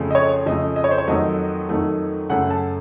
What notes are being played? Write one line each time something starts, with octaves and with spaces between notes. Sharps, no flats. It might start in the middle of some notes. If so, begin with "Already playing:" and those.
Already playing: F2 C#3 F3 A3
D#5
C#5
F2 C#3 F3 A3 D#5
D#5
C#5
C5
C#5
F2 D#3 F#3 A3 D#5
F2 D#3 F#3 A3
F#2 C#3 A3 F#5
A5